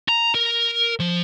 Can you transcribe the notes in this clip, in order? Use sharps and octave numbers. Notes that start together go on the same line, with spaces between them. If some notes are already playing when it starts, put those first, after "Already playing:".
A#5
A#4
F3